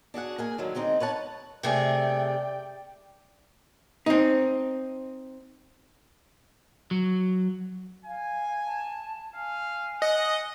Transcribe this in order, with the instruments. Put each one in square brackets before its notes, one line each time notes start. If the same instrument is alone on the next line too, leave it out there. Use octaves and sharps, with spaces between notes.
[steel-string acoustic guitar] D4 F#4 G#4 F#5
A#3 G#4 G#5
D3 D#3 F#3
D3 G#3 C4 D#4
B4 C#5 F#5 A5
[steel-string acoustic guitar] C3 A3 G#4 [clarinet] D5 [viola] G5
[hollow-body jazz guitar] C4 D#4
[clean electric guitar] F#3
[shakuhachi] F5 [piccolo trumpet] G#5
[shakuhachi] A5
[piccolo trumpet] F5 [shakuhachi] G#5
[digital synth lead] D#5 [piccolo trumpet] F#5